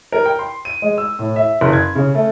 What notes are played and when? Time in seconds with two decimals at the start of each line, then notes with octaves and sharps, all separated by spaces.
0.12 A#4
0.26 G5
0.39 C6
0.65 D#7
0.82 G#3
0.98 E6
1.19 A2
1.36 E5
1.61 F#1
1.73 G#6
1.95 C#3
2.15 A3